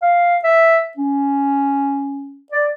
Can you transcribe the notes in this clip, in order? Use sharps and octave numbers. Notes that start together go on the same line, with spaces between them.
F5
E5
C#4
D5